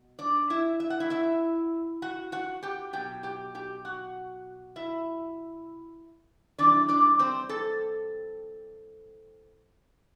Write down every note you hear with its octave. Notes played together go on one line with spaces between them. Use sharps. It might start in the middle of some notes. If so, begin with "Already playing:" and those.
Already playing: B2
D4 D5
E4 E5
E5
F#5
E4 E5
E4 E5
F#4 F#5
F#4 F#5
G4 G5
B2 F#3 G4 G5
G4 G5
G4 G5
F#4 F#5
E4 E5
C3 E3 G3 D4 D5
D4 D5
C4 C5
A4 A5